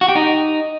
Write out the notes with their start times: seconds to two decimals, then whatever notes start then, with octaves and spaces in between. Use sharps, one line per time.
0.01 F#4
0.08 G4
0.15 D#4